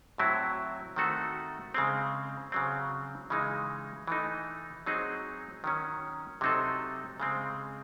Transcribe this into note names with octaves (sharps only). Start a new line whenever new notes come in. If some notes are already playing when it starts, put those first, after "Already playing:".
A2 F#3 C4 E4
D#3 A3 C4 F#4 A4
C#3 G#3 C4
C#3 F#3 C4
C#3 E3 G#3 D#4
E3 A3 D#4
F#3 C4 D#4 G#4
D#3 F#3 C#4
C3 F#3 C4 D#4 A4
C#3 G#3 C4